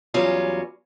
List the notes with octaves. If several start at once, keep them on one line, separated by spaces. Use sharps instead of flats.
E2 F#3 G3 C#4 F4